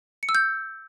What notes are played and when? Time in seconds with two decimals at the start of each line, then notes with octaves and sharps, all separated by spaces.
0.23 C#7
0.29 E6
0.35 G6